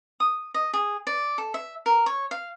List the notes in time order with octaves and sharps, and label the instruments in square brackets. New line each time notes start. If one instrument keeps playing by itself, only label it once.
[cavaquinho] D#6
D#5
G#4
D5
A4
E5
A#4
C#5
F5